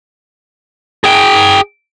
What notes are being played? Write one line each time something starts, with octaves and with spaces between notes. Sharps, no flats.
G#4 G5